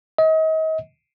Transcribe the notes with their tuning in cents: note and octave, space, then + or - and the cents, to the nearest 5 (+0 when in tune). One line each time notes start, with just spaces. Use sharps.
D#5 +35